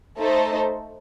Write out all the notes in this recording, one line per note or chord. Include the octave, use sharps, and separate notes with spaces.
A3 D#4 A4 C5